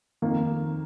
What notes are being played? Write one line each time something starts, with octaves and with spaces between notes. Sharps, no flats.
F2 D#3 A#3